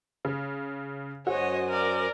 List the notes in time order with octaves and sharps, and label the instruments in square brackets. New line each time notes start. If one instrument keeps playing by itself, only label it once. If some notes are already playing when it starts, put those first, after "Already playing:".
[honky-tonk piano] C#3
[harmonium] F#2 C5 G#5 [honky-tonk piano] F#4 [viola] C#5 D#5
[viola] A#4 D5